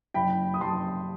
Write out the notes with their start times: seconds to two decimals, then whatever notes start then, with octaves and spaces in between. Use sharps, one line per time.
0.14 F#1 G5 B5
0.54 D#6
0.61 F#1 A5 C6